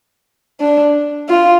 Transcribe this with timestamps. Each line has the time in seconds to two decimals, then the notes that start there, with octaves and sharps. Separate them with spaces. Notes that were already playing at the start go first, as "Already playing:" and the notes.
0.60 D4
1.29 F4